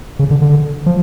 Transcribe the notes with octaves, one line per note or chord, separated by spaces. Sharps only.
C#3
D3
D3
F3